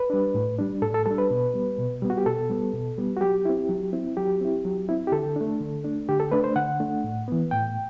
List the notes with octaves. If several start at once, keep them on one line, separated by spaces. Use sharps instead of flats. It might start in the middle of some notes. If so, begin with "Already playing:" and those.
Already playing: B4
G3 D4
A2
G3 D4
A2 A4
A4
G3 D4 A4
B4
B2
G3 B3
B2
G3 B3
F#4
G4
B2 A4
G3 B3
B2
G3 B3
F#4
F#3 G4
C4 E4
F#3
C4 E4
F#3 G4
C4 E4
F#3
C4 E4
G4
D3 A4
A3 D4
D3
A3 D4
D3 G4
A4
A3 D4 B4
C5
D3 F#5
A3 D4
A2
E3 B3
A2 G5